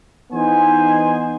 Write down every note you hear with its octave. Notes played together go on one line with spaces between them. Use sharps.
E3 B3 D#4 G#4 C5 G#5